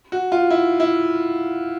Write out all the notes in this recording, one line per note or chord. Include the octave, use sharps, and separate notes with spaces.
F#4
F4
E4
E4